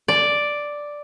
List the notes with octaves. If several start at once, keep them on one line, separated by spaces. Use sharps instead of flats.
D5